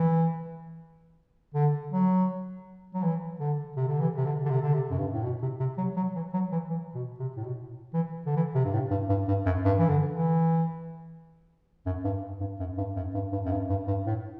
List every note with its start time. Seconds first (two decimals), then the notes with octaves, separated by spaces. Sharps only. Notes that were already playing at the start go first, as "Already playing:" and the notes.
Already playing: E3
1.55 D3
1.92 F#3
2.94 F#3
3.03 E3
3.40 D3
3.77 C3
3.88 D3
4.00 E3
4.17 C3
4.25 D3
4.46 D3
4.50 C3
4.62 D3
4.73 C3
4.91 F#2
4.99 G2
5.14 A2
5.24 B2
5.42 C3
5.60 C3
5.78 F#3
5.97 F#3
6.16 E3
6.34 F#3
6.52 E3
6.70 E3
6.95 B2
7.19 C3
7.37 A2
7.44 B2
7.94 E3
8.26 D3
8.36 E3
8.55 C3
8.65 G2
8.73 A2
8.91 G2
9.09 G2
9.28 G2
9.46 F#2
9.65 G2
9.79 E3
9.89 D3
10.13 E3
11.86 F#2
12.04 G2
12.40 G2
12.60 F#2
12.78 G2
12.96 F#2
13.14 G2
13.32 G2
13.45 F#2
13.52 G2
13.70 G2
13.88 G2
14.06 A2